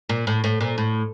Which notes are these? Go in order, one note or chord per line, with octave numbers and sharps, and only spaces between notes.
A#2
A2
A2
A#2
A2